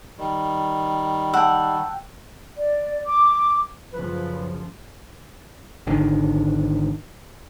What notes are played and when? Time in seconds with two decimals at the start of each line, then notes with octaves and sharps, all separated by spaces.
0.18 D#3 G3
1.34 F#5 G5 A5 E6
2.57 D5
3.08 D6
3.93 F#2 C#3 F3 B4
5.87 G#1 D3 D#3